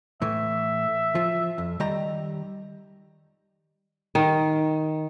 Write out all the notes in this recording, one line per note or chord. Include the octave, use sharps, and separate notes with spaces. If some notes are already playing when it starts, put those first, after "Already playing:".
A2 E3 E5
F3
F2
D#3 G3 A#5
D#3